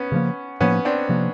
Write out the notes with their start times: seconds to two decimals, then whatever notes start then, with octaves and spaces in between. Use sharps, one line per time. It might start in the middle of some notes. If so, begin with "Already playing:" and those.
Already playing: B3 C#4
0.12 C#3 F3 A#3
0.60 A2 F3 A#3 B3 C#4
0.85 C4 D4
1.09 C3 F3 A#3